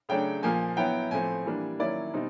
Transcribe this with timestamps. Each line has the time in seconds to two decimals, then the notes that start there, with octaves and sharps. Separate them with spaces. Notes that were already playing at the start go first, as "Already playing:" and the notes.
0.09 C#3 F#3 A3 D4 G5
0.43 A#2 F3 A#3 G#5
0.77 F#3 B3 E4 G5
1.11 A2 F3 A3 C4 G#5
1.46 E3 G3 A#3 D4
1.79 D#3 F#3 A#3 C#4 E4 D5
2.14 B2 G3 C4 D#4